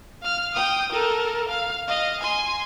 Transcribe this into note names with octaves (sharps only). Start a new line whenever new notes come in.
F5 F6
G5 D#6
A4 A#4
F5
D#5 F5
G#5 C6